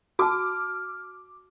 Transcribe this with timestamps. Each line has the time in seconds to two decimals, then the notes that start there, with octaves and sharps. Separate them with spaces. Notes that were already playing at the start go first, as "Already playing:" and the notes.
0.19 F#4 A5 D6 F6